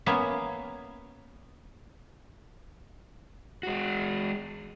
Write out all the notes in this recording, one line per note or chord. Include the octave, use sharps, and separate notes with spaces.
A#3 B3 C#4 E5 F5
G#3 F#4